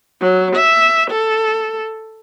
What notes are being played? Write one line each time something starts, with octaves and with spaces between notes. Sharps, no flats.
F#3
E5
A4